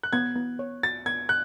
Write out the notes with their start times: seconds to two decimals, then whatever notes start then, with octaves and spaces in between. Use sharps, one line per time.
0.03 F#6
0.13 B3 G#6
0.36 B3
0.59 C#5
0.83 F#4 A6
1.06 B3 G#6
1.29 F#6